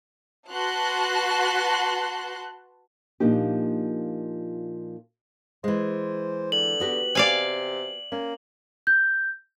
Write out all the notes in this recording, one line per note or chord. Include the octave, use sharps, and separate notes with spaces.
F#4 B4 A5 C6 F#6
A#2 F3 A#3 D4 D#4 G4
E3 G#3 C5
D3 F#7
B3 F#4 G4
C3 D5 F5 G#5
A#3 C#4
G6